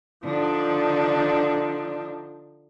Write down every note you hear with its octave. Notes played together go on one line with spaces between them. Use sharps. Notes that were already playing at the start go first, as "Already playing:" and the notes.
D3 F3 D4 D#4